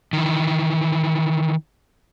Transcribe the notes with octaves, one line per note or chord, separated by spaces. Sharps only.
D#3 E3